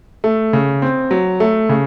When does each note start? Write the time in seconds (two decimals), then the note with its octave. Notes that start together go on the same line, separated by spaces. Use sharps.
0.24 A3
0.53 C#3
0.82 C4
1.11 F#3
1.40 A3
1.69 C#3